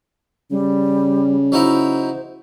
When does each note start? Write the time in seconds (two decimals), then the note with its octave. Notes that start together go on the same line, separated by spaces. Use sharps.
0.51 C#3 G3
1.52 F#3 D#4 E4 C5